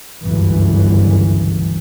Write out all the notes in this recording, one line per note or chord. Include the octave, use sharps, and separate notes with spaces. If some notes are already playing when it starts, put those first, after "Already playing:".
G1 C#2 F#2 E3